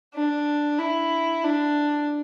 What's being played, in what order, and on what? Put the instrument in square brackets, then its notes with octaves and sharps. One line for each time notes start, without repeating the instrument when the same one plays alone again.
[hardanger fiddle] D4
E4
D4